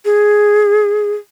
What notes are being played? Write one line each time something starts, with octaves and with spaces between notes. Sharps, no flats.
G#4